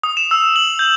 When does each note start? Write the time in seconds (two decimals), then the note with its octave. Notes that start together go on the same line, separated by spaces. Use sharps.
0.04 D#6
0.17 E7
0.31 E6
0.56 F#7
0.79 G6